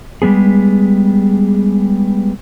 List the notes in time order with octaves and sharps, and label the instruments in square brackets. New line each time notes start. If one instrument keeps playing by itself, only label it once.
[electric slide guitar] G3 G#3 B3 G#4